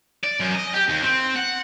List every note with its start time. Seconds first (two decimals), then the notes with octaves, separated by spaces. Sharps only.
0.24 D5
0.41 F#2
0.55 D#5
0.74 G4
0.89 D#2
1.03 C4
1.36 F#5